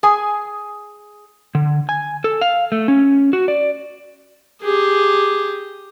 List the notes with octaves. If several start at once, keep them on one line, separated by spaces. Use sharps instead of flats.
G#4 G#5
D3
G#5
A4
F5
A3
C#4
F#4
D5
G4 G#4